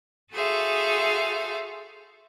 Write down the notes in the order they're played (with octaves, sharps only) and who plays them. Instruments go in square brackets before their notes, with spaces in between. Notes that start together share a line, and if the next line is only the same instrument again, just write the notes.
[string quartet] F#4 G#4 A4 C5 E5 F5